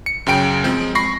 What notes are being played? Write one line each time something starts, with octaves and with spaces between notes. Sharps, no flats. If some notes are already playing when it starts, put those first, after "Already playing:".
C#7
F#2 C#3 G5 D7
F3 G#3 C4
B5 C#6 A#6 C7